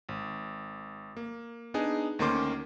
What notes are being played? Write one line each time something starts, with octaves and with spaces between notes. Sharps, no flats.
G#1
A#3
B3 D4 D#4 G#4
D2 D#3 A#3 C#4 C6 D6